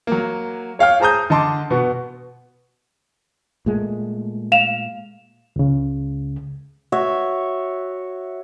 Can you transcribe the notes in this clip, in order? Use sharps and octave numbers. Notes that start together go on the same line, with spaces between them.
F#3 A#3
C#5 F5 G5 F6
G#4 C5 A5 A#5 D#6 G6
D3 D#5 A5 C6 D6
B2 B3 F#4
A#2 G#3 A3
F5 E7 F7
C#2 C#3
F#4 C#5 E5